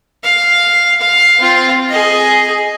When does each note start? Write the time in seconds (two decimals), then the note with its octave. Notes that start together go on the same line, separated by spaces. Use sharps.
0.23 F5
1.01 F5
1.39 C4 F4
1.89 G#4 D#5